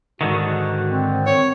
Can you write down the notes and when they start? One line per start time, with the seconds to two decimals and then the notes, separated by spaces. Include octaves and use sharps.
0.21 G#2 D3 D#3 F#4
0.89 C4
1.26 C#5